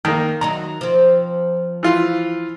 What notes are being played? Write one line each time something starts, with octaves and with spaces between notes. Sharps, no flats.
D#3 A#3 D#4
D#3 F#3 D#4 A#5
F3 C4
E3 F4